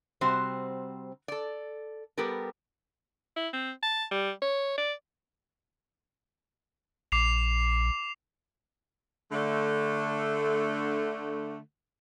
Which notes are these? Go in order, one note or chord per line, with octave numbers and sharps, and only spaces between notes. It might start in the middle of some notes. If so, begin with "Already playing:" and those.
C3 G3 C4 F#4 C5
A4 D5
G3 B3 G4 A4 A#4
E4
C4
A5
G3
C#5
D5
A#1 D6 C7 F7
D3 A3